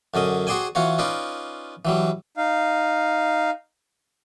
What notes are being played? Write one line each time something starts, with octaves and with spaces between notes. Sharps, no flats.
F#2 D3 C#4 D#5
F#4 G#4 C5 D5 G5 G#5
E3 F4 F#4 C#5
C#4 D#4 F4 B4 D5
E3 F#3 G3
D#4 F5